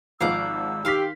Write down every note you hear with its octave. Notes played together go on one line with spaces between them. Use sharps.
G#1 F3 G#3 F5 F#5 D6 E6
D#3 G4 F5 C6 B6